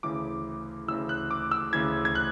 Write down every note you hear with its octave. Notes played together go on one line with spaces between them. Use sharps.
D2 C#3 E3 D6
D2 C#3 E3 E6
F#6
D6
E6
D2 C#3 E3 G#6
G#6
F#6